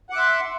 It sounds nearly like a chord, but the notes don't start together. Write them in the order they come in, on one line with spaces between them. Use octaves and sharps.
F#5 D6 E5 C6